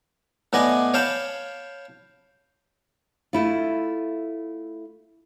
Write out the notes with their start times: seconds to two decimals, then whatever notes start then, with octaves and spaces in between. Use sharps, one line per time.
0.53 A2 B3 D5 D#5 G#5
0.94 C#5 F5 G5 A5 B5
3.33 A3 E4 F4